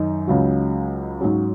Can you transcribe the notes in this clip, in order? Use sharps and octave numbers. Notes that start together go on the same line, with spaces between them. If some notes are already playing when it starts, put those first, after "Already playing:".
Already playing: F#2 D#3 D#4
C#2 C#3 F#3
G#2 F#3 C#4